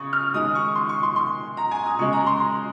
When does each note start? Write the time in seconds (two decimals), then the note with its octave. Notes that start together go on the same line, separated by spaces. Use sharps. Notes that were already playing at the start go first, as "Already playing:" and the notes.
Already playing: C#3 C#6 D#6
0.13 F6
0.34 D#3 G#3 D#6
0.55 C#6
0.75 C6
0.89 C#6
1.03 C6
1.16 C6
1.57 A#5
1.71 G#5
1.86 D#6
1.99 C#3 G#3 C#6
2.13 A#5
2.26 C6
2.40 C6